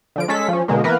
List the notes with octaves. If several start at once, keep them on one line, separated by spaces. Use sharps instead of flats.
D3 F3 D7
G#3 C#4 A4 B6
F3 C#4
B2 D3 G#3 A#3
E3 A#3 B3 A#4 B4